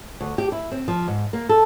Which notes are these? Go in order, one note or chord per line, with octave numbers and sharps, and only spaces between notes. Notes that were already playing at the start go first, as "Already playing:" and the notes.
D2
G4
E4
C4
F3
G#2
A#3
A4